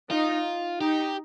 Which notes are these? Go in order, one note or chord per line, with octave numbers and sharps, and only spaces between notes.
D#4 F4
D#4 G4